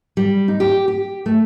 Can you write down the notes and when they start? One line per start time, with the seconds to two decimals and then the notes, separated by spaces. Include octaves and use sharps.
0.17 G3
0.48 D#4
0.60 G4
0.88 G4
1.26 A3